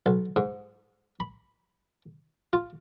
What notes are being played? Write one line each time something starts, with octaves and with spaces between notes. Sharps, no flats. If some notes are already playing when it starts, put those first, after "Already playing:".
B1
G#2
B5
F4